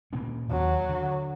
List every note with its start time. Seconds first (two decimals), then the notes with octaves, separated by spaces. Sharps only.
0.13 A#2 A#3 C#4
0.51 D#2 F#3
0.89 D3